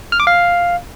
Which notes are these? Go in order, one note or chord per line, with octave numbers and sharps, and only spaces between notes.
F6
D6
F5